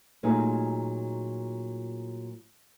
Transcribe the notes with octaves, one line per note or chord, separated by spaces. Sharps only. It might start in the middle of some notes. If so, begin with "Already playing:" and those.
A#2 F#3 G#3 A3 D#4 F4